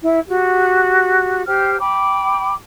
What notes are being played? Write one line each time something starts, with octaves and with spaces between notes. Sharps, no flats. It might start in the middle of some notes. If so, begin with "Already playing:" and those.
E4
F#4 G4
G4 C5 G5 F6
G5 B5 D6